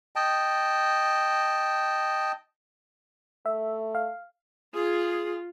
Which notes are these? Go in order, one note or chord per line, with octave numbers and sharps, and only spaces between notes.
D#5 G5 A5
A3 E5
F5
F4 G#4